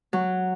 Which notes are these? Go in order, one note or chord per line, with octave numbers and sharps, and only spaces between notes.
F#3